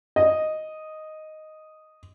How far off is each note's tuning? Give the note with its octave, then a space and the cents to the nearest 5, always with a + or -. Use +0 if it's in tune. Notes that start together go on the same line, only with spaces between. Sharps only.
D#5 +0